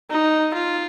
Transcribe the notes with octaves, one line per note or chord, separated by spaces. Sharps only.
D#4
F4